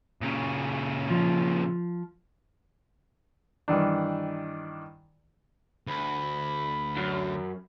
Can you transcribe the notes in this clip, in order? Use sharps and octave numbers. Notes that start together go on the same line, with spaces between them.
A#2 C#3
F3
G2 D#3 E3 D4
D2 B5
F#2